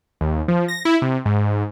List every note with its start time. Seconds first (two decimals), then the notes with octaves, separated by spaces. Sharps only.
0.21 D#2
0.48 F3
0.68 A#6
0.85 E4
1.02 C3
1.25 G#2